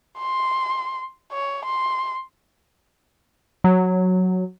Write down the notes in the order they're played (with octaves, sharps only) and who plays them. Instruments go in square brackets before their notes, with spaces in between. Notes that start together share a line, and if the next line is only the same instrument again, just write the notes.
[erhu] C6
C#5
C6
[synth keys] F#3